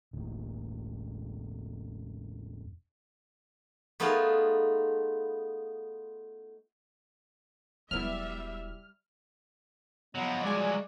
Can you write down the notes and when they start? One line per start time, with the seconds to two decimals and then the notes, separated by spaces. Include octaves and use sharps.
0.13 E1 A2
4.00 A3 B3 D#4 F4 G#4 F5
7.91 E1 F#3 G3 B3 E4 E5 F6
10.15 F3 F#3 B3 D#5
10.43 G3 G#3 D5 G#5